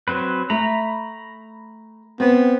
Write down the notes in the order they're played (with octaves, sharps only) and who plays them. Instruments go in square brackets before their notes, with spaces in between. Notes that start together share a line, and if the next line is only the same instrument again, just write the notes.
[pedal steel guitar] F#3 C4 B4
[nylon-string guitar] A3 [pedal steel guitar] A#5 B5
[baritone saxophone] B3 [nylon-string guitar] C4